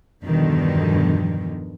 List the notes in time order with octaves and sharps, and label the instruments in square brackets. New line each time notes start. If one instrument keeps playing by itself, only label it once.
[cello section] E2 G2 B2 D3 D#3 F3